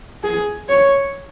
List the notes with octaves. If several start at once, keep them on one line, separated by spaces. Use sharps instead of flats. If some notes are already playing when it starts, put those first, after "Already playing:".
G#4
C#5